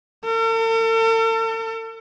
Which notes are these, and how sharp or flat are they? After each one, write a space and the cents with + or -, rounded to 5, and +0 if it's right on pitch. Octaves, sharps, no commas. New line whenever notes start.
A4 +45